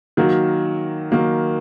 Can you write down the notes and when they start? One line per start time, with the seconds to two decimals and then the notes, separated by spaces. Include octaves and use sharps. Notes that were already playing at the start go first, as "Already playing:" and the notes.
0.17 D#3 F#3 A#3
1.11 D#3 F#3 A#3